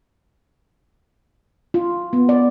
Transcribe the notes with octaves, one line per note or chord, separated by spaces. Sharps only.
F4
B3
D5